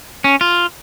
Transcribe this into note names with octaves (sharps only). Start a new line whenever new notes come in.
C#4
F4